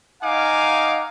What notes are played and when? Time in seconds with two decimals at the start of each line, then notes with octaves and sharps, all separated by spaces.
0.22 D#4 F5 F#5 G#5 D6